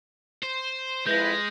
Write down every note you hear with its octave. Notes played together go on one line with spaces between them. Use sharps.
C5
F2 G#3 E4 B4 G6 A#6